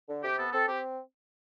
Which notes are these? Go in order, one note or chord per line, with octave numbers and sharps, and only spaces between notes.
D3
C3 G4
B3 A4
C4 A4
C4 G4